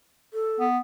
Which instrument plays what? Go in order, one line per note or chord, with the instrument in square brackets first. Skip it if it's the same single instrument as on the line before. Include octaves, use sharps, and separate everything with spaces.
[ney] A4
[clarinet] B3